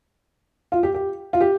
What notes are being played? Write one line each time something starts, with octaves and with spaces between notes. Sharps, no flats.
F4
G4
G4
F4
G4